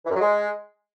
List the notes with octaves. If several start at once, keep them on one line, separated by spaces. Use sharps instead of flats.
E3
F#2
F#3
G#3